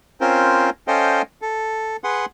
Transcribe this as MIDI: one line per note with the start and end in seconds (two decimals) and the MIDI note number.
0.21 0.70 60
0.21 0.70 61
0.21 0.70 65
0.21 0.70 70
0.21 0.70 72
0.88 1.22 61
0.88 1.22 69
0.88 1.22 72
0.88 1.22 75
0.88 1.22 77
0.88 1.22 79
1.42 1.97 69
2.04 2.26 68
2.04 2.26 71
2.04 2.26 78
2.04 2.26 84